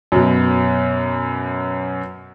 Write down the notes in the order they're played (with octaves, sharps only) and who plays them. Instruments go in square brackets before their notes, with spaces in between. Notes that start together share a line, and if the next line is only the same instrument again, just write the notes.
[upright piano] F#2 B2